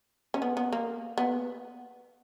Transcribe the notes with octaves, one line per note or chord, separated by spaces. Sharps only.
C#4
B3
B3
A#3
B3